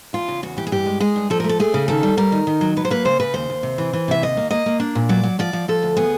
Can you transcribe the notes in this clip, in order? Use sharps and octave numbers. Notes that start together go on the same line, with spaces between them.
E2 F4
C#3
E2 F#4
E3 G4
G#4
G2 G4
G#3
G#3 G#4
G2
F3 A4
A#4
A3
A4
A3 G#4
C#3
D#3 A4
G3
G3 A#4
D#3
D#3
F#3
F#3 B4
C5
A#3 B4
C#3 C5
C#3 B4
D#2 C5
D#2
C3
E3
E3
C3 E5
D#2 D#5
A#3
A#3 D#5
A#3
D4
A#2
F#3 D5
F#3
F3 D5
F3
F3 A4
D2
B3 G#4